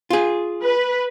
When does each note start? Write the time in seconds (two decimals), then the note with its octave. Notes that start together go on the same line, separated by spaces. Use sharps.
0.10 F4 G#4
0.63 B4